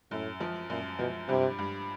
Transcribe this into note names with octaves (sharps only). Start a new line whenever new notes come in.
F#2 A2
F3
F#2 A#2
B2 F3
G2 C3
G2